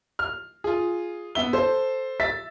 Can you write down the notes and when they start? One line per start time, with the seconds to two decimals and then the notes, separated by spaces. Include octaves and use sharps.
0.19 F6
0.64 F4 G#4
1.35 B3 E5 G7
1.53 A4 C5
2.20 E5 A6 B6